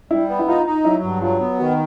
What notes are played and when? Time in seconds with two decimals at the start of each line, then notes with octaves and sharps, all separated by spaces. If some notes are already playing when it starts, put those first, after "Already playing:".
0.11 G3 E4
0.29 B3
0.39 E4
0.48 D#4 F4
0.66 D#4
0.85 F#3 E4
1.03 G2
1.22 F#3 F4
1.41 B3
1.59 D#3 F#4